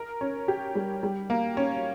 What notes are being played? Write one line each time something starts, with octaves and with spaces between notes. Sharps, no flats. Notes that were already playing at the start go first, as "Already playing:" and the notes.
Already playing: A#4
C#4
G4
G3
G3
A#3
C#4